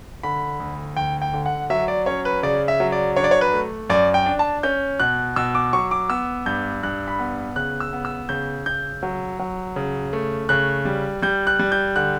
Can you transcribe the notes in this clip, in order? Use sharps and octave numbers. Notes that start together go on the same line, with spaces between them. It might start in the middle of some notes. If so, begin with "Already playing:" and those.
D3 B5
D2
D2 G5
G5
D3
F#5
F#3 E5
D5
C#4 C#5
B4
C#3 D5
E5
F#3
D5
D4 C#5
D5
C#5
B4
A3
F#2 D5
G5
D4
A5
C#4 G6
B2 F#6
B2 E6
D6
F#3 C#6
D6
B3 E6
G2 G6
G2 F#6
B5
B3
C#3 F#6
E6
B3
E6
C#3 G6
C#3 G6
F#3
F#3
C#3
A3
C#3 F#6
G3
G3 G6
F#6
G3
G6
D3 F#6